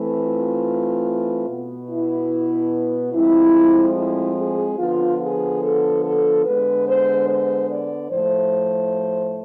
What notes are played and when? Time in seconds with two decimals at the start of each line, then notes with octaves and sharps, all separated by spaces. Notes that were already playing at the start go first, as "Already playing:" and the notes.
Already playing: E3 A3 C4
0.23 F4
1.47 B2 B3
1.88 E4
3.13 A2 F3 G#3 C4 E4
3.95 E4
4.37 G#4
4.78 D3 F3 B3 F4
5.20 G#4
5.61 A4
6.03 A4
6.44 D3 G#3 B3 B4
6.86 C5
7.27 C5
7.68 D5
8.09 A2 F3 A3 C5